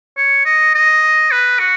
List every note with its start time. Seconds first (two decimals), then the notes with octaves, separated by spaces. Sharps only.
0.17 C#5
0.45 D#5
0.75 D#5
1.32 B4
1.59 F#4